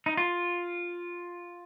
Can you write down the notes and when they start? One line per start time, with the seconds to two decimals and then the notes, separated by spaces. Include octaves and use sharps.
0.06 D#4
0.17 F4